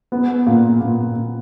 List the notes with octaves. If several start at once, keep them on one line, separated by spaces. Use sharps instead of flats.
B3
A#2
A#2
A#2